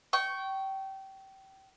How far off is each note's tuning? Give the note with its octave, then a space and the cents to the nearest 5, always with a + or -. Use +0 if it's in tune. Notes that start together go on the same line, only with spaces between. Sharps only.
G5 -25 C#6 +0